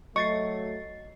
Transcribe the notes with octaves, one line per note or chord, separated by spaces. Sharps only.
F#3 A3 D#5 C#6 A6 C7